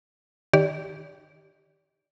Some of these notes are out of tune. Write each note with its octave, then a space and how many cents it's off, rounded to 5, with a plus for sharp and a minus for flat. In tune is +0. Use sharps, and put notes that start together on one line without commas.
D#3 +0 G4 +0 D5 -30